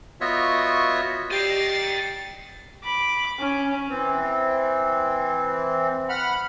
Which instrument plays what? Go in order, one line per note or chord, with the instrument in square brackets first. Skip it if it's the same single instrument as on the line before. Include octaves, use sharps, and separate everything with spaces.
[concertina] B3 F4 F#4 C#5 D#5 E5
[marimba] G4 [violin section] D5 A#6 C7 [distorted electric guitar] D#5 G5 [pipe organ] A6
[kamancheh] B5 D6
C#4
[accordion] E3 C4
F#5 B5 F6